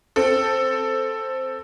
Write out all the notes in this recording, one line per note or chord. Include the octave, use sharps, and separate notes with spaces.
C4 A4